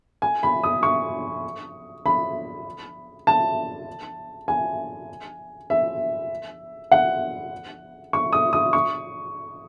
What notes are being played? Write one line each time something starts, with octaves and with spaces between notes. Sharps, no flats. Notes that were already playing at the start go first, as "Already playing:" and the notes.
G#5
B5
D#6
C#6
B5
A5
G#5
E5
F#5
C#6
D#6
D#6
C#6